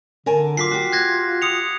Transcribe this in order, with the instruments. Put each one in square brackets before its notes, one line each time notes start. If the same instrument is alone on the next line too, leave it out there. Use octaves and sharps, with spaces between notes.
[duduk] D3 [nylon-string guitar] A#4 G#5 A5
[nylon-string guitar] F#3 [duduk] F4 [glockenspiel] D6 B6 C7
[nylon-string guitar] F#4 G4
[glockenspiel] F#6 G#6 A#6
D#6 C#7 F7